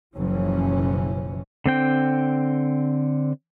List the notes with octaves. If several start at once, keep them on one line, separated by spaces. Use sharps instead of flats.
F#1 B1 E3 F3 C#4
D3 C4 G5